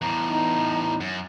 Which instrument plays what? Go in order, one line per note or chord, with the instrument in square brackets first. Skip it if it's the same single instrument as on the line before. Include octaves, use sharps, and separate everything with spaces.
[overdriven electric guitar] E2 A2 [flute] A#5
[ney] D#4
[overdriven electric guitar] F#2